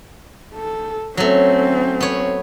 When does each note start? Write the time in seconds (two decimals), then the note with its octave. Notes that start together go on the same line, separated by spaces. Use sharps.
0.55 A4
1.17 F#3 A3 C4 C#4
2.01 B3 C#5